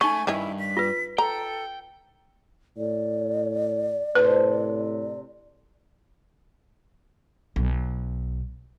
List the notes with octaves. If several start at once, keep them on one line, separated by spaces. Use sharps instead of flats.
A3 C#4 D#4 G#5 C#6
G2 D#3 C#4 E4
B6
F4 B4
A4 G5 A#5
A2 D5
A2 C3 D4 B4
B1